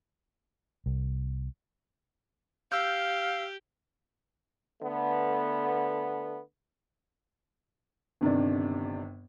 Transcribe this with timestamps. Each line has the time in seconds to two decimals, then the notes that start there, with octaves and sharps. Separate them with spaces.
0.86 C2
2.72 G4 F5 E6 F6 G6
4.82 D3 A3 B3
8.21 G1 C3 D#3 D4